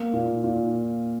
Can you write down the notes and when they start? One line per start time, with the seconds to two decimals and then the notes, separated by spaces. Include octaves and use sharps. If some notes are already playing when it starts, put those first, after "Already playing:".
Already playing: A#3
0.13 A#2
0.44 A#2